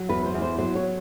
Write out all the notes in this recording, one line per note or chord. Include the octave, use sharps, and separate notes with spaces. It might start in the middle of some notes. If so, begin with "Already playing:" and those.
Already playing: F#3
E2 B4
C5
E2
C5
F#3 C5
C#5